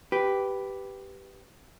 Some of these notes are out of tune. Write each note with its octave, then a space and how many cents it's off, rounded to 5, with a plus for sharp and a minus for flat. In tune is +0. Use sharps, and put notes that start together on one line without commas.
G4 -5 B4 +0